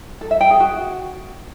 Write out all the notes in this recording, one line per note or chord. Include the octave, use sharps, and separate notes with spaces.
A4
E5
G5
G#4
F#4